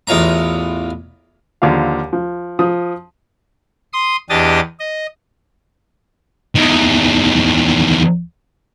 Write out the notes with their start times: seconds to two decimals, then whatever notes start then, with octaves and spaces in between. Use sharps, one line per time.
0.07 A1 E2 F4 C#5 A#5
1.62 D#2 D3 F3 F5
2.13 F3
2.59 F3 D#6
3.93 C6 D#6
4.30 E2 D4 G4 D#5 D#6 A6
4.79 D#5
6.56 E2 D#3